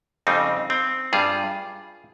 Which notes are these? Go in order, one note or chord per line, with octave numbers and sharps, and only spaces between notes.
F2 C#3 G3 C4 D#4
C4
G2 G3 F4 G#4